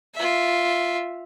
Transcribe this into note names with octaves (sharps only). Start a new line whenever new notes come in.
F4 E5